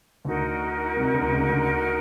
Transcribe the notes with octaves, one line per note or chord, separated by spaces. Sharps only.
D2 D3 D#4 F#4 A#4
C2 C3
D2 D3
C#2 C#3
D2 D3